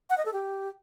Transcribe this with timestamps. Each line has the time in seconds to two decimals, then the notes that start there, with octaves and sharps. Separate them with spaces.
0.10 F#5
0.18 D#5
0.25 A4
0.33 G4